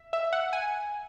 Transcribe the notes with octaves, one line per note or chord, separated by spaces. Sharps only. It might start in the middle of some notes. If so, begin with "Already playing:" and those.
Already playing: E5
E5
F#5
G#5